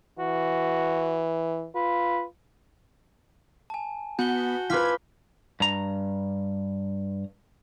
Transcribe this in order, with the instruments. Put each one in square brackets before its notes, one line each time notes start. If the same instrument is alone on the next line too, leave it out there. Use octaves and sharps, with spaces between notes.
[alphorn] E3 [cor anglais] F#4
[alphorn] F4 [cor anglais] B4
[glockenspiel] G#5 A5
[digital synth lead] B3 [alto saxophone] F#4 [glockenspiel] G6 G7
[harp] F4 B4 [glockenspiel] D6 F6 B6 [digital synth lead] G#6
[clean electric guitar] G2 A#5